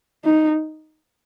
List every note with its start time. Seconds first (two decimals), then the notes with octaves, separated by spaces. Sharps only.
0.25 D#4